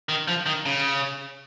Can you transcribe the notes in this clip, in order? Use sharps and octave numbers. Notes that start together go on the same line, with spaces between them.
D#3
F3
D#3
C#3